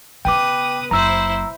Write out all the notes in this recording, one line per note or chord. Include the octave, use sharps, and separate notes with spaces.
C#3 B3 B4 G5 D6 D#6
F#1 E4 C5 A#5 E6